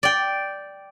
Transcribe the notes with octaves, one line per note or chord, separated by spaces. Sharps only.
D5 G5